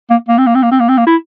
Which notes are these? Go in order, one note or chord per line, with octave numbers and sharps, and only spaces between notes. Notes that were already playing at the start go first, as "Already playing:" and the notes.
A#3
A#3
C4
A#3
C4
A#3
C4
A#3
C4
A#3
E4